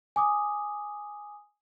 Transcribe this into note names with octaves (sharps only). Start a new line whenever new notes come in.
G#5 D6 D#6